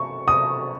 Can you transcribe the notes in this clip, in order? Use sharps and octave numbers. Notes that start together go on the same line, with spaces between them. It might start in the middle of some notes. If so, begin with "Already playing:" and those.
Already playing: C#6
D#6